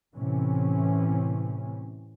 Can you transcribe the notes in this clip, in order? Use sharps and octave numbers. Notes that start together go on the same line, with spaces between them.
A2 C3 E3 C#4